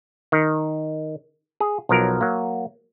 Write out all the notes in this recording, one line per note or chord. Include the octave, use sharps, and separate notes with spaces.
D#3
G#4
B1 F3 F#3 A#4
F#3 A#3